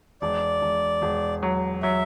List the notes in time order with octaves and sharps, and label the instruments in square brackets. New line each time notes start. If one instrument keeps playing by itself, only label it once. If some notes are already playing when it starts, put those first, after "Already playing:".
[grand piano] E1 [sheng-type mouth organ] D5
[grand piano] E1
E1
F#3
[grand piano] F#3 [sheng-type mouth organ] E5